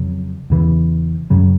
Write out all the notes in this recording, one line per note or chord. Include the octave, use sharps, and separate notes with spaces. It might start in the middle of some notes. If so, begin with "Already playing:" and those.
Already playing: F2 C#3 F#3
E2 C#3 E3
F#2 C#3 F#3